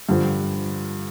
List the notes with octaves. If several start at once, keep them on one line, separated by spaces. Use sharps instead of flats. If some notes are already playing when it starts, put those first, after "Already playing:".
G2 D3 F3